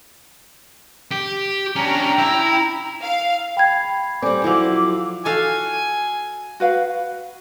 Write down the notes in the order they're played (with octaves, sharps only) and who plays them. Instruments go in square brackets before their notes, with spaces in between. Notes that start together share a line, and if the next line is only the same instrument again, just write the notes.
[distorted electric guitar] G4
[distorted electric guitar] C#4 D4 [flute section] G5 A#5
[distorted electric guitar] E4
[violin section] F5
[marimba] G5 G#6 [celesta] B5 C7
[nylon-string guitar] G3 C4 [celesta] A4 D5 G#5 [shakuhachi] D6
[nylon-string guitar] F3 F#3 E4 [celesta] A4 E6
[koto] F#4 A4 F5 [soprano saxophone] G#5
[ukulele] F#4 B4 F5